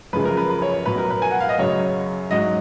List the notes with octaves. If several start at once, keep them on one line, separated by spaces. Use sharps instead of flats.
F#2 C#3 F3 G#3 B4
A#4
B4
B4
C#5
C#5
B2 F#3 B4
A#4
B4
G#5
F#5
F5
D#5
F#2 C#3 F#3 C#5
G#2 F#3 D#5